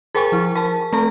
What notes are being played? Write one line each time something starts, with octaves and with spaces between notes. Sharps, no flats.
G#4 A#4 C5 G5 G#5 C#6
F3 E4
A#4 A5
A3 C4 A4 A5